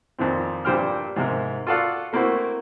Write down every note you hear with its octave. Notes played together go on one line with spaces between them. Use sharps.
F2 A#2 D#3 C4
G2 A#2 G3 C5 G5 F6
G#2 C3 A#4
F4 F#4 A4 D5 F5 F#5
A3 A#3 C4 E4 F#4